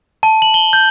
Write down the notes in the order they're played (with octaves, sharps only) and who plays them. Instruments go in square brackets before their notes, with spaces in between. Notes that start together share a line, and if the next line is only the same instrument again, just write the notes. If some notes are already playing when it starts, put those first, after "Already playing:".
[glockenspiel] A5
F#7
G7
G6